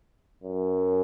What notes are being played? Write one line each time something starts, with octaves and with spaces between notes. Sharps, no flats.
F#2